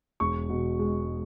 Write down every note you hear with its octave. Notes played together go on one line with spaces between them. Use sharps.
E1 C#6
B2
G#3